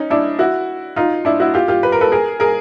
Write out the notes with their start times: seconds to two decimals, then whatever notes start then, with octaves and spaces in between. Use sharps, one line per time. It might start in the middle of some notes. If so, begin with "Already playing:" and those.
Already playing: C#4 D#4
0.10 D4 E4
0.39 E4 F#4
0.96 D#4 F4
1.25 D4 E4
1.40 E4 F#4
1.54 F4 G4
1.68 F4 G4
1.83 B4
1.92 A#4
2.01 A4 B4
2.12 G#4 A#4
2.40 G#4 A#4